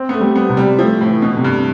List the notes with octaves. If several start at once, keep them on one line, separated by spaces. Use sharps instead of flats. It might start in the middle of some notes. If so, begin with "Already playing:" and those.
Already playing: C4
B3
A3
G3
B3
C3
G3
F3 A3
A2
E3
B2
C3
G2